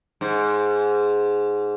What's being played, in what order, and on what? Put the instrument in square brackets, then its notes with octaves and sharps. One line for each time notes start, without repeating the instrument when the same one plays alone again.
[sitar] G#2